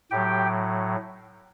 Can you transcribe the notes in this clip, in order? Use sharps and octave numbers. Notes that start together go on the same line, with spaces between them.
A2 F#3 G4 G5